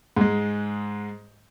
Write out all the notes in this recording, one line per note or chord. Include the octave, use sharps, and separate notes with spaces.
G#2 G#3